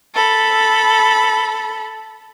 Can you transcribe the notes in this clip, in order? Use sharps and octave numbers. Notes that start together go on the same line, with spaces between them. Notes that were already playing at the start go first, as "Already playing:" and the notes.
A4 B5